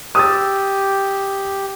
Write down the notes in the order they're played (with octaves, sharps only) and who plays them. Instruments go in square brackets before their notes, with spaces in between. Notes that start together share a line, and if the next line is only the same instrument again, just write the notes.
[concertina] G4 [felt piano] D#6 E6 A6